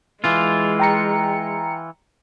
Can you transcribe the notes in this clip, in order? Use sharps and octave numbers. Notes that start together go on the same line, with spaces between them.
E3 G#3 F4
G5 A#5 C#7